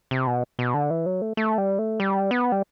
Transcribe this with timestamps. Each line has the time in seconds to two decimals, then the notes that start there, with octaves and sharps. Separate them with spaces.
0.11 C3
0.27 B2
0.59 B2
0.74 D3
0.90 E3
1.06 F#3
1.22 A3
1.37 A3
1.58 G3
1.79 A3
2.00 G3
2.31 B3
2.52 G3